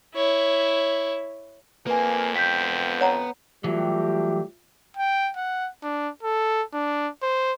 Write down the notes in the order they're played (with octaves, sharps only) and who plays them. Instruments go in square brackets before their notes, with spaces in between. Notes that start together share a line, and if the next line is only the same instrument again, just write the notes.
[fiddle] E4 C#5
[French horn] F2 [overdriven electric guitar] A#3 [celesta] B4 G#5
[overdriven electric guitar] B3 G5 [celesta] G6 B6
[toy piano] C#5 F#5 A#5
[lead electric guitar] E3 F#3 [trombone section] G3 A3 G4 [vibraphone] F4 E5
[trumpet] G5
F#5
D4
A4
D4
C5